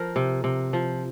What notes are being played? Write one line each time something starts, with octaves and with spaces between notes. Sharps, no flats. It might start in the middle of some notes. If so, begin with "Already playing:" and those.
Already playing: F3 A#4
C3
C3
F3